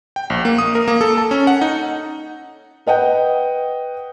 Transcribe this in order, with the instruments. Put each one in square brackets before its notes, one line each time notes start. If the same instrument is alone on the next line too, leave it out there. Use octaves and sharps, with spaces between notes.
[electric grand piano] G5
A#1
A#3
D#6
A#4
A#3
A4
A5
C#4
F#5
D#4
[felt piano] B4 D#5 F#5 G5